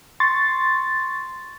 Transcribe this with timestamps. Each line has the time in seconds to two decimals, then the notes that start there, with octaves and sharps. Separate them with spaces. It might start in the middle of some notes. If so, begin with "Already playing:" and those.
0.20 C6 C#6 A6